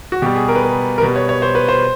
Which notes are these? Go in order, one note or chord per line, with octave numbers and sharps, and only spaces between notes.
F#4
B2 G3 G4
G#4
A#4
B4
A#4
A#4
B2 G3 B4
C#5
C#5
C5
B4
C5